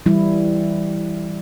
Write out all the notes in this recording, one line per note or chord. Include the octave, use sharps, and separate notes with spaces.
E3 G3 E4